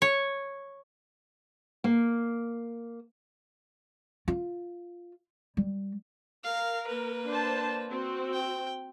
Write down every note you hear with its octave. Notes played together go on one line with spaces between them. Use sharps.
C#5
A#3
F4
G3
A#4 F5
A#3 B4
D4 C5 A5
C4 F#4
G5